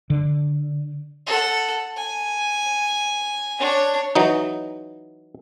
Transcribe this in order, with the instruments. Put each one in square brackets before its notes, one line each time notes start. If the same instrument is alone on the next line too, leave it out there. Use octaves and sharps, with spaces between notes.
[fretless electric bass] D3
[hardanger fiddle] A4 F#5
G#5
D4 C#5
[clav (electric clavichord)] E3 F#3 D#4